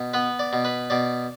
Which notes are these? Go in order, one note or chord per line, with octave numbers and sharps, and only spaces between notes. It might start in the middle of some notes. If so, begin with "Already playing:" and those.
Already playing: B2
B3 B4
D5
B2
B4
B2 D5